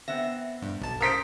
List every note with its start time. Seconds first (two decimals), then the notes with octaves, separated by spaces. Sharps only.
0.08 B3 C4 E5 A#6
0.62 G2
0.81 B1 A5
1.01 A#4 C5 D#6 B6 D7